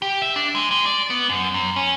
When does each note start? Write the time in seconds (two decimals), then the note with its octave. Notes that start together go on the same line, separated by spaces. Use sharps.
0.02 G4
0.22 E5
0.36 D4
0.55 G#3
0.71 G#3
0.86 D5
1.10 B3
1.30 F#2
1.54 F#2
1.76 C#4